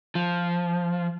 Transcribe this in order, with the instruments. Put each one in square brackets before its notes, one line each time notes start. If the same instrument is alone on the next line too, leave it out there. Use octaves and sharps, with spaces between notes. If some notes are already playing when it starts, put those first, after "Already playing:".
[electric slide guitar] F3